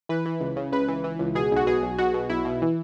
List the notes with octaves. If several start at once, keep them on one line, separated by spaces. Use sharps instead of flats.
E3 B4
E3
C#2
C#3
C#2 B4
E3
E3
C#2
B2 G#4
B1
F#4
B2 G#4
B1
B2 F#4
B2
B1 E4
B2
E3